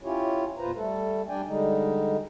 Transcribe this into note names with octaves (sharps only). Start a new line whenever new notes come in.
C#4 E4 F4 G4 C#5
E2 A#2 F4 B4 C5 A#5
G3 A3 A4
G3 D4 D5 G5 G#5
D3 G3 G#3 D#4